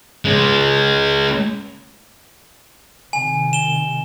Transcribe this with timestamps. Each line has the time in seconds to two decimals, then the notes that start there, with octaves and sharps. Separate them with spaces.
0.25 G#3 C#4
3.13 C3 D#3 G#5
3.53 E7 G7